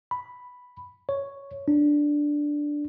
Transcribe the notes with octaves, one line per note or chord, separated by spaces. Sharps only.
B5
C#5
D4